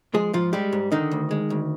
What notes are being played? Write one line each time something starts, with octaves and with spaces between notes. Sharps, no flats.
F3 G#3 G#4
G#2 F3 F4
G3 G#3 G4
G#2
D3 D#3 D#4
D2
G#3
D2